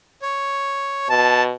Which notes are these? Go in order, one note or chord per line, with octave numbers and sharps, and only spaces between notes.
C#5
B2 A5